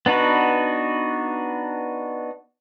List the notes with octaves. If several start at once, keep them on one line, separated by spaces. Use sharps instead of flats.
B3 D4 D#4 F#4 B4